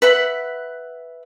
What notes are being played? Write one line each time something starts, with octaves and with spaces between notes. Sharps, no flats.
B4 E5 F#5 B5